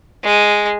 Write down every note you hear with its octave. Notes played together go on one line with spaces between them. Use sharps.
G#3